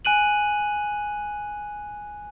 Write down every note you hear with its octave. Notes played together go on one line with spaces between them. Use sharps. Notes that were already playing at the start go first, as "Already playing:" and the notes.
G#5 F#6 D#7 F#7